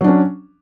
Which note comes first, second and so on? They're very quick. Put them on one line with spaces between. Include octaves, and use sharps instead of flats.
F#3 D4 C#4